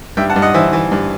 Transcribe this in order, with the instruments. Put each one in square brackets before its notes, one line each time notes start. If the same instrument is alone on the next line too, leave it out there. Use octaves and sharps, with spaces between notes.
[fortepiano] G2 E5 G5
F#5 A5
G2
D#5 F#5
E3 C5 E5
E3
G2